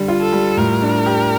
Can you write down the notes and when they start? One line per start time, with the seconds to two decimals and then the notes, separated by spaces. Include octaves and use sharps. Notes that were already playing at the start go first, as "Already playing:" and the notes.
Already playing: D3 G3
0.08 F4
0.21 A4
0.33 G3
0.57 A2 A#4
0.82 D4
1.06 G4